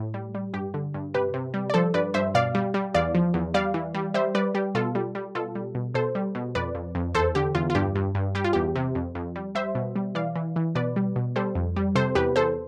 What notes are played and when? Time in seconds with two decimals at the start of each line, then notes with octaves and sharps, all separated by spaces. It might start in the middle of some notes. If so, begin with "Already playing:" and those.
Already playing: A2
0.14 G3
0.35 G3
0.54 G2 G4
0.74 D3
0.94 G2
1.14 C3 G4 B4
1.34 C3
1.54 G3
1.70 D5
1.74 F3 A4 C5
1.94 G2 B4 D5
2.14 G2 C5 E5
2.34 B2 D5 F5
2.55 G3
2.74 G3
2.94 E2 D5 F5
3.15 F3
3.34 E2
3.54 G3 D5 F5
3.74 E3
3.94 G3
4.14 G3 C5 E5
4.35 G3 B4 D5
4.55 G3 G4
4.75 B2 F4 A4
4.95 G3
5.15 G3
5.35 B2 F4 A4
5.55 G3
5.75 B2
5.94 B2 A4 C5
6.15 G3
6.35 B2
6.55 F2 B4 D5
6.75 F2
6.95 F2
7.15 E2 A4 C5
7.35 D3 G4
7.55 E2 F4
7.70 F4
7.75 G2 G4
7.96 G2
8.15 G2
8.35 G3 G4
8.44 F4
8.53 E2 G4
8.76 C3
8.95 F2
9.15 F2
9.36 G3
9.55 G3 C5 E5
9.75 B2
9.96 G3
10.15 E3 D5 F5
10.36 E3
10.56 E3
10.75 B2 B4 D5
10.96 G3
11.16 B2
11.36 G3 A4 C5
11.55 F2
11.76 G3
11.95 C3 A4 C5
12.15 E2 G4 B4
12.36 E2 A4 C5